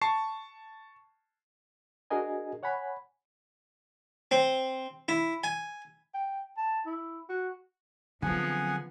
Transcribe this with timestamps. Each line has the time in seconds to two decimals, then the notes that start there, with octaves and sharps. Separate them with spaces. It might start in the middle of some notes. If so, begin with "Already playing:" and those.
0.02 A5 C#6 C7
2.10 D4 F#4 G#4 A#4 D#5 G#5
2.63 C#5 F#5 G#5 B5
4.31 C4
5.08 E4
5.44 G#5
6.14 G5
6.57 A5
6.86 E4
7.29 F#4
8.22 D3 F3 F#3 B3 C4 G#4 F#5 G#5